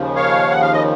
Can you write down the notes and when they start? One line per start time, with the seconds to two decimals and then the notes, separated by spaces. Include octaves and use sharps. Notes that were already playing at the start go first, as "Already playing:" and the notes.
Already playing: D#2 C#3 F3
0.16 C#5 F5
0.51 F#5
0.62 F5
0.73 D#5